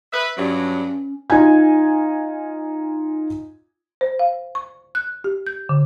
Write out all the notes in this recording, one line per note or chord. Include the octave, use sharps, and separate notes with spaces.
B4 E5
G2 F#3 C#4
D#4 F4 G#5 G#6
C5
F5
C#6
F#6
G4
G6
D3